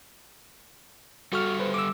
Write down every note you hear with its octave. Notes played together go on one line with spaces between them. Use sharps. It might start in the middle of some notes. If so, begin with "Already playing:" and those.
G3 F#4 A4 C#6 F6
B4 C5
D6 E6